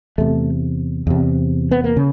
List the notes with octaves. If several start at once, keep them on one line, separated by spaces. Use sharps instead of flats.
E2 C3 A3
E2 C3
B3
A#3
C#3